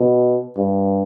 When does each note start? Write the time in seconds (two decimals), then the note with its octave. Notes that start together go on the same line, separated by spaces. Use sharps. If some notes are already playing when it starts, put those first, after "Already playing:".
Already playing: B2
0.57 G2